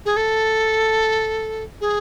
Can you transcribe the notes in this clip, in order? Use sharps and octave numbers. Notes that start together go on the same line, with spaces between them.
G#4
A4
G#4